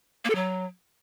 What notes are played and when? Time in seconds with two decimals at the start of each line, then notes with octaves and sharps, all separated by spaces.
0.25 A#3
0.30 A4
0.35 F#3